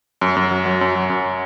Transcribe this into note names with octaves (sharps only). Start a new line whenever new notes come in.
F#2
F#2
F#3
F#3
F#2
F#3
F#2